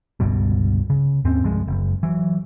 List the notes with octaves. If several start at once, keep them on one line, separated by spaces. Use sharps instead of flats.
G1 C#2 G2 B2
C#3
D#2 G#2 C4 C#4
C2 G2 F3 G#3
F#1
E3 F#3